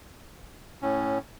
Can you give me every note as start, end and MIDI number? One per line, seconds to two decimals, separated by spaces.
0.82 1.18 45
0.82 1.18 61